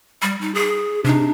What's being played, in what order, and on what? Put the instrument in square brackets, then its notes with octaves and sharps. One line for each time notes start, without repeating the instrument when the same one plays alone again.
[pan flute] G3
D#4
G#4
[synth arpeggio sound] C3 D#4 [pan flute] D4